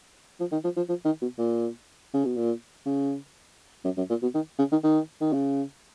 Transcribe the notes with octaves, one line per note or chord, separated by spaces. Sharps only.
F3
D#3
F3
F3
F3
D#3
B2
A#2
C#3
B2
A#2
C#3
F#2
F#2
A#2
B2
D#3
C#3
D#3
D#3
D#3
C#3